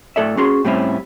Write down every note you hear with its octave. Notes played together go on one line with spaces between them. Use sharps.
A2 A4 D5 E5
C#4 F#4 G#4 C6
A2 G3 C4 C#4 E4